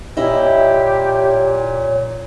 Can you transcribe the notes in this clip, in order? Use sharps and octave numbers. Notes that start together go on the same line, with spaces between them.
A#2 E4 G4 C#5 D#5 E5